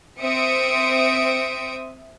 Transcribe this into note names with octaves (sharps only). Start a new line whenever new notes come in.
C4 C5 E5 D#6 C#7 D7